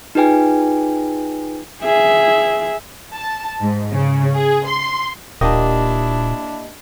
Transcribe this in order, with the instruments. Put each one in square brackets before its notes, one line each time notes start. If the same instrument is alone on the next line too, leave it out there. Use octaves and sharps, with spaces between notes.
[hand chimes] D#4 F4 G#4 B4 G5 G#5
[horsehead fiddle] G#4 E5
[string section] A5
G#2
C#3
G#4
C6
[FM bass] D1 [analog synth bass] A#2 [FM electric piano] A#3 G4 D#5 [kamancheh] D4 E4